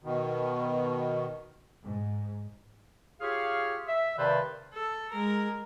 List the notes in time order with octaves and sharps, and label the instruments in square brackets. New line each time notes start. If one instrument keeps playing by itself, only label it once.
[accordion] B2 D#3
[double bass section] G#2
[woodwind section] F4 G4 G#4 C#5 F5
E5
G2 C3 D#3 B4 C5 D5
[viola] A4
G#3 A#4